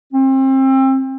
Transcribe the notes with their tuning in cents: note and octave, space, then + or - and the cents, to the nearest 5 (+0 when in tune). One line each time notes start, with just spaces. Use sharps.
C4 +30